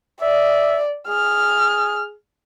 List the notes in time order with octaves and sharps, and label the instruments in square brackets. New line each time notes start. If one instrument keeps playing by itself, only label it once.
[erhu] D5 [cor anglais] E5
[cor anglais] G#4 [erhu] F6